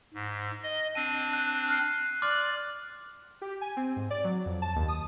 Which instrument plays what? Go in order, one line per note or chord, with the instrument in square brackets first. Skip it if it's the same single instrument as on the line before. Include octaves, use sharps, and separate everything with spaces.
[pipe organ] G#2
D#5
[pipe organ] C4 D4 [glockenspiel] D#7
[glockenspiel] F#6
F6 F#6 C7
[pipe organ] D5 F#6 [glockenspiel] C6 D6 F6
[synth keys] G4
G#5
C4
G#2
D5
F#3
F2
A5
D#2
D#6